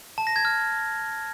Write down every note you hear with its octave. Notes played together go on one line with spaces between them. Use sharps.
A5
A#6
G#6
F6